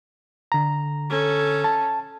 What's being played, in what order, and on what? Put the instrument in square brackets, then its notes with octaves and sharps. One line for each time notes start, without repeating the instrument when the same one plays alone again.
[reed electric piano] D3 A#5
[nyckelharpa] C#4 A4
[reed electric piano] A5